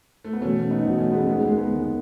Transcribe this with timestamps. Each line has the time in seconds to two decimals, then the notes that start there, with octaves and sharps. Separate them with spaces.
0.25 A3
0.33 B3
0.41 E1 E2 B2 A3 C#4
0.70 B3 D#4
0.84 E1 E2 B2
0.98 A3 C#4
1.12 G#3 B3
1.26 D#2 D#3 G#3 B3
1.37 G#3
1.48 G#3
1.58 G#3 B3
1.69 D#2 D#3